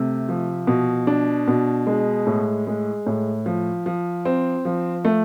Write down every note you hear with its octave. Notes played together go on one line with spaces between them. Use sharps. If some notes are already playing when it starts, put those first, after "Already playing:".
Already playing: C3 A3
F3
B2
D4
B2
G#3
A2
G#3
A2
F3
F3
C4
F3
A3